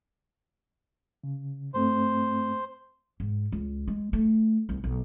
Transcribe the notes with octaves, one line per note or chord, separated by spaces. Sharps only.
C#3
G2 A3 C4 C5
G#2
C#2
G#3
A3
C2
B1